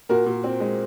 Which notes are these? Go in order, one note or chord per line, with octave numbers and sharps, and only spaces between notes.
A#2 F#4 A#4
A#2
C4
G#3